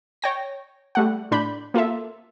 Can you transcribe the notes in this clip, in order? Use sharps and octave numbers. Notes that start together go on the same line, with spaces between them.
C#5 G5 A#6
G3 A3 F#5
A2 D4 B5 G6
A#3 F4 A4 E5